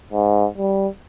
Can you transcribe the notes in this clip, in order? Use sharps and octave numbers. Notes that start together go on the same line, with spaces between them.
G#2
G3